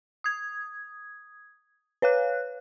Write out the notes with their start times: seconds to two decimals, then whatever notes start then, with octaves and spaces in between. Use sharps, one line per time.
0.24 D#6 G#6
2.02 B4 C#5 F5 F#6